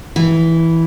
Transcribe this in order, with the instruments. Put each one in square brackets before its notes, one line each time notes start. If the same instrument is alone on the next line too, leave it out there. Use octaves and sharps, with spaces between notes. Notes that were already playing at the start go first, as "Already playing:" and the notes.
[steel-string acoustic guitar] E3